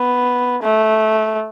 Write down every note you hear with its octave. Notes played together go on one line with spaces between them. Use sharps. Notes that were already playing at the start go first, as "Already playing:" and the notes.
Already playing: B3
A3